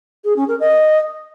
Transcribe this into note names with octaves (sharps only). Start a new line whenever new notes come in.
G#4
C#4
A#4
D#5